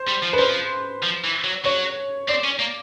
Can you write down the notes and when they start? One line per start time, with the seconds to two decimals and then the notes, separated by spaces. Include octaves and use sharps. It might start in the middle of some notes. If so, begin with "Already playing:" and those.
Already playing: C5
0.08 G3
0.23 F3
0.33 B4
0.39 F3 C5
1.03 F3
1.24 E3
1.44 F#3
1.65 F#3 C#5
2.29 C4 D5
2.44 C#4
2.59 A#3